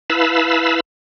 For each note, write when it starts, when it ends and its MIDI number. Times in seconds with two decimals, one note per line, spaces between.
0.10 0.80 64
0.10 0.80 71
0.10 0.80 77
0.10 0.80 81
0.10 0.80 83
0.10 0.80 88